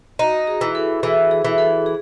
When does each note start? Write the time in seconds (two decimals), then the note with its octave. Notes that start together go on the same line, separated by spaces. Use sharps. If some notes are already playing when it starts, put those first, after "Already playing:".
0.19 D#4 F#4
0.47 G#4
0.61 E3
0.75 A4
1.03 E3 G#4
1.31 G#4
1.44 E3
1.58 A4
1.86 G#4